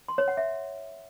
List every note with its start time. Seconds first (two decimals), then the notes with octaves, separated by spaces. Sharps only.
0.08 C6
0.18 C#5
0.28 F#5
0.37 E5